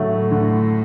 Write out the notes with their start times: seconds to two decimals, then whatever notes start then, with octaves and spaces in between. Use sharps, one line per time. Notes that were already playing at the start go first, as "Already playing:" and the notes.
Already playing: A2 D3 F#3 A3
0.31 D3